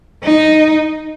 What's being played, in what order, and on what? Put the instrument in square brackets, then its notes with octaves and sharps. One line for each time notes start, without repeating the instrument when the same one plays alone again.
[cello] D#4